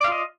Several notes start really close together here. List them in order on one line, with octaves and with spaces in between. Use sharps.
D5 F5 F4 D#5